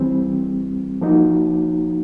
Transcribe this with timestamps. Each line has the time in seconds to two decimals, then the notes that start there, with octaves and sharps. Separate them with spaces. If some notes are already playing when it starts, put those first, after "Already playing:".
Already playing: E3 G3 C4
1.01 F3 A#3 D#4 F#4